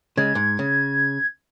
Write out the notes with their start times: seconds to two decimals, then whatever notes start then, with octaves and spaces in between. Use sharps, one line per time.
0.17 C#3 G#3 G#6
0.35 G#2
0.59 C#3